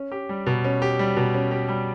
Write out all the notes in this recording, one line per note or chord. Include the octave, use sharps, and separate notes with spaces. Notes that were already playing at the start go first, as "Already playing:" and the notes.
Already playing: C#4
G4
G3
B2
C#4
G4
G3
B2
C#4
G4
G3